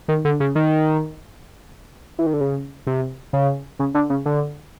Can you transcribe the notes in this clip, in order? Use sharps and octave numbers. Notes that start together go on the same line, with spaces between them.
D#3
D3
C#3
D#3
E3
D#3
D3
C#3
C3
C#3
C#3
D3
C#3
D3